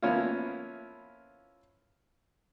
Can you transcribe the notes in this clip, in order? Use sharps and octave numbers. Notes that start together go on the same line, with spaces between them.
F3 A#3 B3 C#4 E4 F4